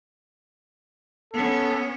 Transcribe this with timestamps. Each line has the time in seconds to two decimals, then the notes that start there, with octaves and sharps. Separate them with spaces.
1.34 B3 C#4 A4